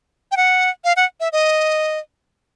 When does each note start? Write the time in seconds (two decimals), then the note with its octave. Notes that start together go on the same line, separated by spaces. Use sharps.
0.32 G5
0.37 F#5
0.84 F5
0.96 F#5
1.20 E5
1.33 D#5